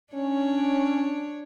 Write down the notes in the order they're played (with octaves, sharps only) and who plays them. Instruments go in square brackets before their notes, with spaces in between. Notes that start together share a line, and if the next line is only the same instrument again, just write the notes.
[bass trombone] C#4 [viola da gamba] D4 C#5